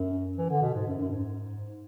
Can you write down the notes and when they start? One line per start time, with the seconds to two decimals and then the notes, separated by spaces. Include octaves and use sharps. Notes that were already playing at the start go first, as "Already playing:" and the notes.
Already playing: F#2
0.38 E3
0.50 D3
0.62 B2
0.74 G#2
0.87 F#2
0.99 F#2
1.11 G#2